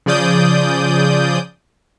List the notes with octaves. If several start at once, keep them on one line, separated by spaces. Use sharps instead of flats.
C#3 F3 G#4 D5 D#6 G6